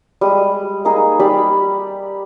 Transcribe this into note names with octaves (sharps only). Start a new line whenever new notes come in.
G3 G#3 D#6
A#3 D#4 G#4
G3 G4 D5 B5